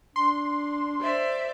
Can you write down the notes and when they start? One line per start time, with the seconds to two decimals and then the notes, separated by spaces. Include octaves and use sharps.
0.16 D4 C6
0.99 C5 D5 E5